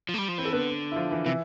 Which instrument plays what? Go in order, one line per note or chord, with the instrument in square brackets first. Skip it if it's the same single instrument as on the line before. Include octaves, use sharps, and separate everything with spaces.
[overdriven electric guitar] F3
A3
G3
F3
[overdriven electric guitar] E3 [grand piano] C4 C5
[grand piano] A4
[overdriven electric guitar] D3 [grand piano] B3 B4
[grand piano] E4
F3 F4
E3 E4
[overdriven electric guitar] C3 [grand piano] E3 E4